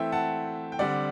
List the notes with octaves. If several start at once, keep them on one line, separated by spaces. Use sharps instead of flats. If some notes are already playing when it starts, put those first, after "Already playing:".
Already playing: E3 A3 C4 E5 G5
F#5 A5
G5
D3 G3 C4 D5 F#5